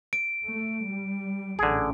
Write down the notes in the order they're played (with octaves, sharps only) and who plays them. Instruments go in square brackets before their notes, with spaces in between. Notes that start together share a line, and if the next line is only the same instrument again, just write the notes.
[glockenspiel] D7
[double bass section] A3
G3
[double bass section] A1 C#4 [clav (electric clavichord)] D3 G#4